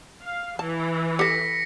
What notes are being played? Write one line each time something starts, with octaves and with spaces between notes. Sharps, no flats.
F5
E3 A5
G4 A4 A#6 B6 C#7